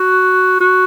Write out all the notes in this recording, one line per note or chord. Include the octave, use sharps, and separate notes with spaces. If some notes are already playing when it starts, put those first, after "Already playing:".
Already playing: F#4
F#4